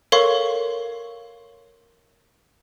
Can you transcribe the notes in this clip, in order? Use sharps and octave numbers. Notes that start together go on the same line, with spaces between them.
A4 A#4 C#5 F5 C6 C#6